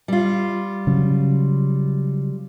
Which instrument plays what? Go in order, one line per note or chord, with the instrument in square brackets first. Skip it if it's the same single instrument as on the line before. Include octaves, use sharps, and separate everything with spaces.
[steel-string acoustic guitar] G3 F4
[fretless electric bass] C#3 F#3